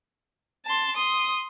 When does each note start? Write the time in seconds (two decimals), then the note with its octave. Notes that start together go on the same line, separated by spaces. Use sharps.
0.66 A5 C6
0.96 C6 D#6